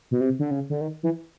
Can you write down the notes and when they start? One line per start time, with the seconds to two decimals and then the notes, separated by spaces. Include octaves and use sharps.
0.11 B2
0.21 C3
0.39 D3
0.51 C#3
0.70 D3
0.81 D#3
1.03 E3